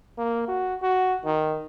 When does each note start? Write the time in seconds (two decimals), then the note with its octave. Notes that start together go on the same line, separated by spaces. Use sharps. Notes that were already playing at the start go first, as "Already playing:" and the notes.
0.18 A#3
0.48 F#4
0.82 F#4
1.25 D#3